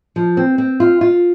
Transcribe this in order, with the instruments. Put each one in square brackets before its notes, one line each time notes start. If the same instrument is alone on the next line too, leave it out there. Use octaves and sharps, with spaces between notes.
[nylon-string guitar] F3
C4
C4
F4
F4